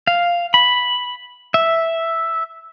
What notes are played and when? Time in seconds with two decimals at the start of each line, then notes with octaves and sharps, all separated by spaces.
0.07 F5
0.54 B5
1.54 E5